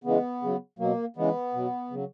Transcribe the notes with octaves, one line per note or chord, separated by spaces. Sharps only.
C#3 E3 G#3 B3
C#3 F#3
B2 F#3 A#3
C#3 E3 G#3 B3
B2 F#3
C#3 F#3